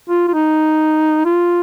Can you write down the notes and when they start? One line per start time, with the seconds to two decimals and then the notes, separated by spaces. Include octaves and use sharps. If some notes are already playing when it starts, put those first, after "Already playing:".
0.10 F4
0.28 F4
0.34 D#4
1.25 F4